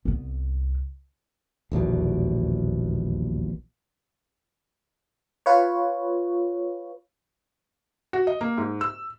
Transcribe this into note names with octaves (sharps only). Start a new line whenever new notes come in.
C2 B3
D#1 A#1 E2 B2
F4 B4 C#5
F#4
D#5
A#3
G#2
E6